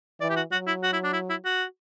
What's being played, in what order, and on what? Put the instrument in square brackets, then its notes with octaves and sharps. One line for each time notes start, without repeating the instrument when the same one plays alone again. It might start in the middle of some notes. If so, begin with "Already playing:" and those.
[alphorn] E3 [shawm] D5
[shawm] G4
F#4
[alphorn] F#3 [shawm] F#4
[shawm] E4
F#4
E4
D4
E4
E4
F#4